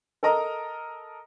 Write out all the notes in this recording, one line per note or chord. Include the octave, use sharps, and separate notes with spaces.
A4 A#4 D#5 A#5